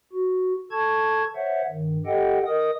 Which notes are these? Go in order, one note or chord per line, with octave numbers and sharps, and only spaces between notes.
F#4
A4 A5 C#6 G#6
C5 C#5 E5 F#5
G2 D#3
G4 A4 D#5 F#5 G5
A#4 D#5 D#6